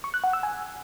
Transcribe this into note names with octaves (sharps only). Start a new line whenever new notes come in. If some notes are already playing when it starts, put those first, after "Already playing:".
C#6
F#6
F#5
E6
G#5